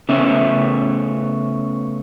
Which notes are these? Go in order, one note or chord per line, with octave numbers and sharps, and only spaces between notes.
C#3 A3 B3 E5